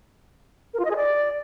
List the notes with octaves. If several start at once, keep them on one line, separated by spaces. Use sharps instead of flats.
A#4
F4
D#5
G#4
D5